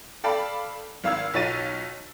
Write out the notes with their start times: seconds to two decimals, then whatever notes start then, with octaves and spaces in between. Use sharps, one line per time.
0.24 A4 D5 F5 G5 A5 B5
1.04 G#1 F5 E6 G#6
1.34 B1 F4 C#5 A6 D#7